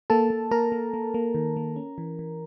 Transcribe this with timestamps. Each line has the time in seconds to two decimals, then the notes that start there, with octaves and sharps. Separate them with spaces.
0.10 A#3 A4 A5
0.30 A#3
0.51 A#3 A#4 A#5
0.72 A#3
0.94 A#3
1.14 A#3
1.35 D#3
1.57 A#3
1.76 C#4
1.98 E3
2.19 E3